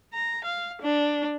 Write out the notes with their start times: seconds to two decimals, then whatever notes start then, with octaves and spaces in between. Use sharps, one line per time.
0.14 A#5
0.44 F5
0.82 D4